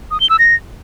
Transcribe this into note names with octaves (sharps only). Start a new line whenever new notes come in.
D#6
G7
E6
A#6